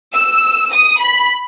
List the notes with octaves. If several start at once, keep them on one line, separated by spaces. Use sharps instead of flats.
E6
D#6
B5